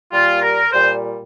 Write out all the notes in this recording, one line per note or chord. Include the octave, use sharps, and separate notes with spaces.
A#2 G3 F4
A#4
A#2 G3 C5